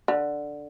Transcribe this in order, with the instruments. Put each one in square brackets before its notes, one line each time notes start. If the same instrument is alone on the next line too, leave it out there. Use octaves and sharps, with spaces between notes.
[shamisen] D3